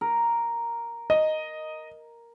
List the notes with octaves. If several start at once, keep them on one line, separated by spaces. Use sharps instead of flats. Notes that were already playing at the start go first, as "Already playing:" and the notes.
A#4
D#5